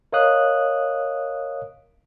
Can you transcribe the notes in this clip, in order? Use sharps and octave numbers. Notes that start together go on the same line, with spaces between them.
A#4 C#5 D#5 F5 D#6 F#6